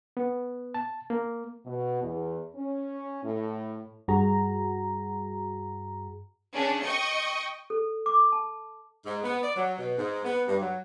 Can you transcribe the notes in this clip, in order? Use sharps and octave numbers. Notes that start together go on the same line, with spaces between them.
B3
A5
A#3
B2
E2
C#4
A2
G2 F#4 G#4 A#5
C#3 C#4 D4
D#5 G5 C#6
A4
D6
A5
G#2
B3
D5
F#3
B2
G#2
B3
G2
F#3